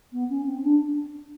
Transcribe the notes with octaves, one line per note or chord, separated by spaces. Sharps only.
B3
C#4
C4
D4